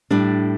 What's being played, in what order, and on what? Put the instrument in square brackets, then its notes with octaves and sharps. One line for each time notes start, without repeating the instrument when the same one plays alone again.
[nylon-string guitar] A2 G3 D4